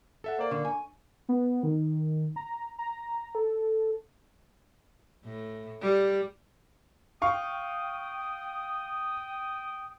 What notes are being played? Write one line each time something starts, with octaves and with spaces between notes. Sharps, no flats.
A4 E5 F#5
A#3 C5 D5
D3 C#6
G#5
B3
D#3
A#5
A#5
A4
A2
G3
F5 G5 C#6 D#6